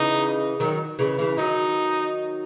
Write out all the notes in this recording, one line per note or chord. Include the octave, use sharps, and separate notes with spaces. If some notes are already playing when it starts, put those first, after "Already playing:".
Already playing: C#3 E3 D#4
D#3 F#3
C#3 E3
C#3 E3
D#3 F#3 D#4